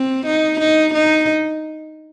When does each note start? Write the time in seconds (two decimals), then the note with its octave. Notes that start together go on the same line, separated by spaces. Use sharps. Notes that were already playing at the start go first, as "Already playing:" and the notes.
Already playing: C4
0.26 D#4
0.60 D#4
0.94 D#4